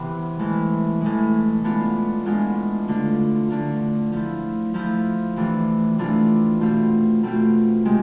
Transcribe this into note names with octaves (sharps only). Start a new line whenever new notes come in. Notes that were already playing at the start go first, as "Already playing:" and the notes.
Already playing: C3 E3 B3
A2 E3 G#3
A2 E3 G#3
A2 G#3 B3 D4 F4
A2 G#3 B3 D4 F4
D3 A3 D4 F4
D3 A3 D4 F4
F3 A3 E4
F3 A3 E4
C3 E3 A3 D4 F4
C3 E3 A3 D4 F4
B2 A3 C4 F4
B2 A3 C4 F4
C3 G#3 C4